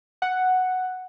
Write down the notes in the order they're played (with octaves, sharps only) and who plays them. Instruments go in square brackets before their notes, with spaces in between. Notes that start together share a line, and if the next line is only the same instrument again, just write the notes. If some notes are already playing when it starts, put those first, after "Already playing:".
[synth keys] F#5